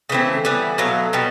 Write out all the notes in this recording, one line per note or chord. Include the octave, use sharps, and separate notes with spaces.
C#3 E3 A3 C4
E3 G3 B3
B2 F#3 A3 F5
B2 G3